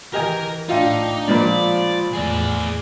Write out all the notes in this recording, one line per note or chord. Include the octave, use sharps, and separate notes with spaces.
E3 G4 A#4 D#5 G#5 A#5
A2 D4 D#4 F4 E5 F5 G5
A#1 A#2 F3 G#3 F4 A#4 D5 B5
E2 A2 G#4 D5